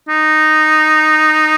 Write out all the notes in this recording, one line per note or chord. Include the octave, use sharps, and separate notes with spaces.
D#4